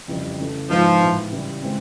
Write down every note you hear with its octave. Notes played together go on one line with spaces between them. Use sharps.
F2 C#3 E3 G3
C#3 E3 A3
G#2 E3 F3 G#3 B3 D#4
A2 E3 G#3 B3
C#3 E3 G3
C#3 E3 G#3 C4